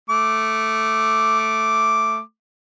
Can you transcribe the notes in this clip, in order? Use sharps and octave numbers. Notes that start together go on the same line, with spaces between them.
A3 D6